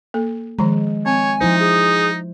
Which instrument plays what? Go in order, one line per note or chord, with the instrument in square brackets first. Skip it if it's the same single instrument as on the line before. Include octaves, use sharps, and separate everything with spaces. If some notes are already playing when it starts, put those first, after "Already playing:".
[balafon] A#3 A4
[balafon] D#3 F3 A#5 [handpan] G#3
[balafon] C4 [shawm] C#5 [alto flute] G#5
[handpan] F3 E4 C5 [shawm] D#4
[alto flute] G#4